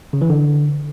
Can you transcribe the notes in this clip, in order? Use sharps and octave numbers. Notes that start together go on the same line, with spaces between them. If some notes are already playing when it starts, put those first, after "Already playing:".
C#3
E3
D3